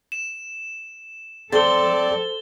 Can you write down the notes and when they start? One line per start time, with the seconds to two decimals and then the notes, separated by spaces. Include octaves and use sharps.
0.12 E7
1.52 C4 A4 C5 D5 A6 G7